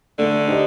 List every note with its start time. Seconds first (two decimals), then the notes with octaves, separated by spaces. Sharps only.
0.18 D3 A3
0.47 D#4 G4 C5